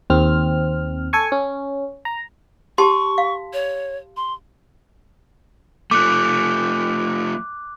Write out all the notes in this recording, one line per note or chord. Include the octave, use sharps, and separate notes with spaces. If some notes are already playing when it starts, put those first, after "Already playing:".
D#2 C4 F6
A4 G#5 C#6
C#4
A#5
G4 A5 C6 C#6
F5
C#5
C6
F3 A3 D6 F#6